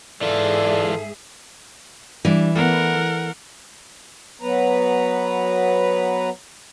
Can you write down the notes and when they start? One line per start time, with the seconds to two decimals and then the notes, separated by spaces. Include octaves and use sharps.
0.22 G#2 E3 F4 G#4 A4 D5 E5
2.25 E3 G3 D4
2.55 A3 B3 A#4 F#5
4.41 F#3 B3 B4 A#5